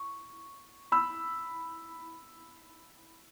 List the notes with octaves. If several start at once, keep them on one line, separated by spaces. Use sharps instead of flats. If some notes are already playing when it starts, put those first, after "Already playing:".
Already playing: C#6
B5 E6